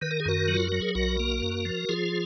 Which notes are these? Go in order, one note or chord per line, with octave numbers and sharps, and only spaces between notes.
D#3 B4
A#4
G#4
F#2 F#4 A#4
F#3
F4
F#3 F#4
G#4
B1 F#4 A#4
A#3
F#2
F3
F3 F4 G#4